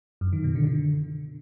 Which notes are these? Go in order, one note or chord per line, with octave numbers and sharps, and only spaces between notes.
F#2
D#3
B2
D3
D3